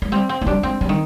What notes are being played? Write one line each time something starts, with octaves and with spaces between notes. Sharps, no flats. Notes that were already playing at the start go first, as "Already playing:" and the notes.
G#3
G3 C4
C4
F3
G3 D4
G#3 C4
G3
D#3